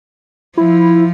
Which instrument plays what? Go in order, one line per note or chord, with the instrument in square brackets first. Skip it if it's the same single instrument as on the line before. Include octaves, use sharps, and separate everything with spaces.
[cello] F3 [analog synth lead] E4